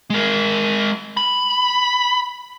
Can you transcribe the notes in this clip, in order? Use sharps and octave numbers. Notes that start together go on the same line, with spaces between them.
G#3 A#4
B5